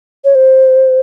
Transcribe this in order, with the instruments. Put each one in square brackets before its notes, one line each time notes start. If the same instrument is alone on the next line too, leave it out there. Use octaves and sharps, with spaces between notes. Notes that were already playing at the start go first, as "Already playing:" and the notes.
[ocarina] C#5
C5